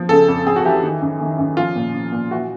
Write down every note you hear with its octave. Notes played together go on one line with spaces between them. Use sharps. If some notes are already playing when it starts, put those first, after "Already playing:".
Already playing: F3
C#3 A4
F2
F2 G#4
F#4
E3 G4
D#3
F#2
D#3
F#2
F3 F4
A#2
F3
A#2
E3 F#4